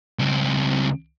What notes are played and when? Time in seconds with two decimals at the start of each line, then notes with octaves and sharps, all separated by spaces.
0.19 C#2 C4